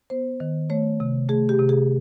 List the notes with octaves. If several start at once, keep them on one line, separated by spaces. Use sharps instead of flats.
B3 C5
D#3
A3 C#5
C3
A3 G#4
G4
C3
G#4